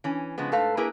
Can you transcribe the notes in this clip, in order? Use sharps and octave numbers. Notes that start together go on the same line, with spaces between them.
E3 C#4
C#3 F3 G#3 B3
G#2 A3 A4 B4 F5
A#3 E4 G#4 A#4 B4